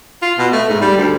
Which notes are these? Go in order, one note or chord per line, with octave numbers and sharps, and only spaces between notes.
F4
B2
A3
G#2
G3
D2